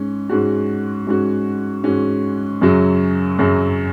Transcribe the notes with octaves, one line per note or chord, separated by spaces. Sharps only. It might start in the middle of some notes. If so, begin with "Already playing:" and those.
Already playing: G#2 G#3 C#4
G#2 G#3 C#4 F#4
G#2 G#3 C#4 F#4
G#2 G#3 C#4 F#4
F#2 C#3 F#3 C#4
F#2 C#3 F#3 C#4